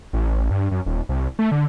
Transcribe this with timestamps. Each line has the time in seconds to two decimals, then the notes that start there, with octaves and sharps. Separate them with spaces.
0.13 A1
0.50 G2
0.71 F#2
0.86 D#1
1.09 C2
1.39 A3
1.52 D3